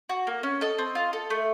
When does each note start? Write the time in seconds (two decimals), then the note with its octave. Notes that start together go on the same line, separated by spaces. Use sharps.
0.09 F#4
0.27 A#3
0.43 C#4
0.61 A4 D#5
0.78 C4
0.95 F4
1.13 A4
1.30 A3